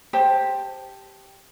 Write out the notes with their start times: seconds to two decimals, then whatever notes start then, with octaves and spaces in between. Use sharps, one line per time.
0.13 G4 C5 A5